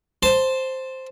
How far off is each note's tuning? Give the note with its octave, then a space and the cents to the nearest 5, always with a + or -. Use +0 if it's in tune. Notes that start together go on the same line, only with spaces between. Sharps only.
C5 +0 A5 +10